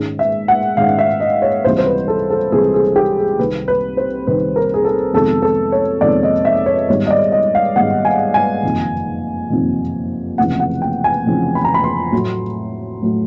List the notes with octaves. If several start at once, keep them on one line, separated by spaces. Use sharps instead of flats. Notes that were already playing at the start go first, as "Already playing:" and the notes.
Already playing: G#2 D#3 G#3 C#4
E5
F#5
G#2 D#3 G#3 C#4 F5
E5
D#5
C#5
C#2 C3 E3 G3 C5
C5
B4
A4
A4
C#2 C3 E3 G3 G#4
G#4
G4
G#4
C2 C3 D#3 B4
B4
C5
C2 C3 D#3 B4
A#4
G#4
A4
F2 C3 D#3 G#3 B3 A4
A4
C#5
F2 C3 D#3 G#3 B3 D5
D#5
E5
C#5
G#2 D#3 G3 B3 C#5
D#5
D5
D#5
F5
G#2 D#3 G3 B3 F#5
G#5
G#5
F#1 F2 C3 D#3
F#1 F2 C3 D#3
F1 F2 C#3 E3 F#5
F#5
G5
G#5
F1 F2 C#3 E3
B5
A#5
B5
C6
A2 F#3 A3
A2 F#3 A3